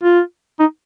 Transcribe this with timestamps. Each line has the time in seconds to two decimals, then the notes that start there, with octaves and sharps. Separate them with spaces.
0.03 F4
0.60 D#4